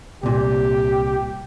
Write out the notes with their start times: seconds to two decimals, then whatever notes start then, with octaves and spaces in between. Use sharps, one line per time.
0.23 C2 A#2 G4